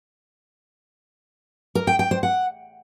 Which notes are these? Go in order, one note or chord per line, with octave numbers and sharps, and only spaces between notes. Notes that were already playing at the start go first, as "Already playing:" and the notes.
A#4
G5
G5
C5
F#5